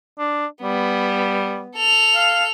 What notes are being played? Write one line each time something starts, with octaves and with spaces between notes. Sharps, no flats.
D4
G3 B3
A4 F7
F5